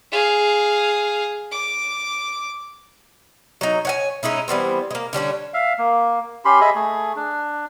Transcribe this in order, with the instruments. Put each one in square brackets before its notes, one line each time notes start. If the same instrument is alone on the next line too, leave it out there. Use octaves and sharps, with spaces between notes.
[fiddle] G#4 F5
D6
[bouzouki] F#3 D#4
C#5 F#5 G#5
G#3 C#4 D#4 E4
E3 G3 B3 C4
G#3 A#3
D3 G3 C#4 D4
[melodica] E5 F5
A#3
C#4 G4 B5 C6
G#4 D#5 E5 B5
A3 G#4
D4